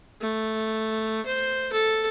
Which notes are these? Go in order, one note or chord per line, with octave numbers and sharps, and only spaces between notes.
A3
C5
A4